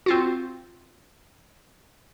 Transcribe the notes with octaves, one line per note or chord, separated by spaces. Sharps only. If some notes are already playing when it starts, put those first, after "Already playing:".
C4 F4 F#4